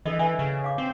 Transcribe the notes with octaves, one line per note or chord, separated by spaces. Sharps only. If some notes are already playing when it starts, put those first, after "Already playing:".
E3 A4 D#5
E3 B4 E5 G#5
C#3
C#5 F5 D6
C4